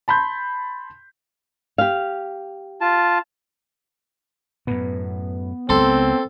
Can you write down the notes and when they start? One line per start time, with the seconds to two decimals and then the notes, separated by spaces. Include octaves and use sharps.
0.08 A5 B5 C6 G6
1.78 G4 F5
2.81 F4 A5
4.67 F#2 A2 B3
5.69 C#2 C4 A4 C6